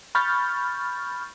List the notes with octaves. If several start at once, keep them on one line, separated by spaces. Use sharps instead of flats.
B5 C#6 F6 G6 A6